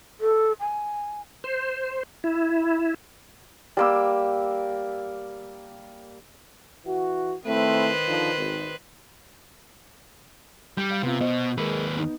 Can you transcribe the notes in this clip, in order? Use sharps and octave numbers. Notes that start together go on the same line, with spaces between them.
A4
G#5
C5
E4
G3 A#3 E6
E3 F#4
D#3 A3 C4 E4 B4 C5
D3 F3 D#4
G#1
G3 G6
F5
C3 B3 F4
B2 C5 D#5
D#2 G#3 A#4 B4
B3 D#4